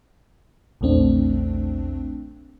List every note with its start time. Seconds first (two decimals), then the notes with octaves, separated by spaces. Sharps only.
0.81 A#1 E2 A3 C4 D4